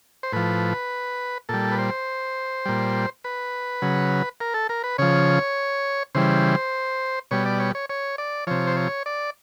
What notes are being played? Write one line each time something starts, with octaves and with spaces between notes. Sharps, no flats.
C5
A2 F3 B4
A#2 G3 A4
B4
C5
A#2 G3
B4
C#3 F#3
A#4
A4
A#4
B4
C#3 F3 C#5
C#3 E3 G3 C5
B2 G3 C#5
D5
C#5
C#5
C#5
D5
C3 F3 C#5
C5
C#5
D5